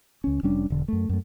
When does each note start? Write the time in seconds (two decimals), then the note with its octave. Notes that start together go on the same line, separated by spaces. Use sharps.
0.24 C#2 C#4
0.43 F1 G3 C#4 D4
0.70 E1 D3
0.88 F#2 A3
1.09 F#2 A3